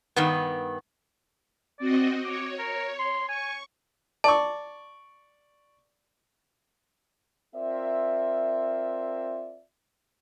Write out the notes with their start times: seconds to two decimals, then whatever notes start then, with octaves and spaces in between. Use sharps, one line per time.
0.16 G2 D#3 B3
1.79 C4 F#4 D5 D#5
2.24 C#5 D6
2.59 A#4
2.99 C6
3.29 G#5 C#6
4.24 D5 A5 C#6
7.55 C4 F4 A#4 D5 E5